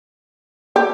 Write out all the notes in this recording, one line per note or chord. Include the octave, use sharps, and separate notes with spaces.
G4